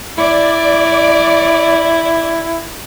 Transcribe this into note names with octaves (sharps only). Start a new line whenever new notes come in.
E4 D5